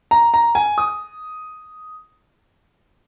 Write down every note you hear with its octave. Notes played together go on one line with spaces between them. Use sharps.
A#5
A#5
G#5
D#6